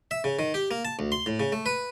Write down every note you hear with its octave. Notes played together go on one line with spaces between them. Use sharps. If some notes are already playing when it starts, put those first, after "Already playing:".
E5
C#3
D#3
G4
A#3
A5
D2
C6
A2
C#3
A3
B4